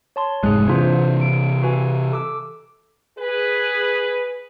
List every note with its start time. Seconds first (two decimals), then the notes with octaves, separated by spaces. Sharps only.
0.16 C#5 A5 C6
0.43 F1 G#2 G#3 G#4 F#6
0.68 C3 E3 D4 F4 C5
1.21 D7
1.62 F#4 B4 G#5
2.12 A4 D6 E6
3.18 G#4 B4